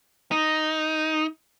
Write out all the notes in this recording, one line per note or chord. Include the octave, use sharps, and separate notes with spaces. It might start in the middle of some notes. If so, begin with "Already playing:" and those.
D#4